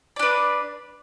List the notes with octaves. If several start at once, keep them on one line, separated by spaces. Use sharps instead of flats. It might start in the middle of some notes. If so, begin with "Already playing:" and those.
D4 B4 D5